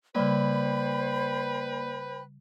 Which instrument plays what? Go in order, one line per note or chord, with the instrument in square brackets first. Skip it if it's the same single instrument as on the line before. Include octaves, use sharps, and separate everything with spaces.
[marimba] C#3 G3 [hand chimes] A#3 D5 [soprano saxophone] B4 [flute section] C5 G5 B5